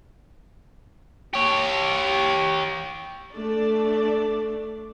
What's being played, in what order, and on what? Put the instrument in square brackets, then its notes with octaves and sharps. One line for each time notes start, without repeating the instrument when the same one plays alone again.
[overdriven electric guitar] G4 C#5
[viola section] A3 D4 D5